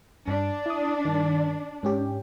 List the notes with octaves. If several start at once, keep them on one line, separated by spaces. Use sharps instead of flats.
G2 D4
E4 D#6
G2 D#3
G#2 C#4 G4